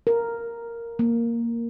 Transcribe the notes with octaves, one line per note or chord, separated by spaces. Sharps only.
A#4
A#3